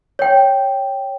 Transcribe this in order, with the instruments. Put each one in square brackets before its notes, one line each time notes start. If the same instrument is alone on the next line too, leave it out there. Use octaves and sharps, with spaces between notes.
[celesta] C#5 G5